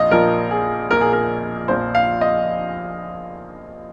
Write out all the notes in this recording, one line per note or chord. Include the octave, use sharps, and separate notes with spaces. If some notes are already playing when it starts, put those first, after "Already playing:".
Already playing: A#1 A#2 F3 D#5 F5
A#1 A#2 F3 A#4
G#4
A#1 A#2 F3 A#4
G#4
A#4
A#1 A#2 F3 C5
F5
D#5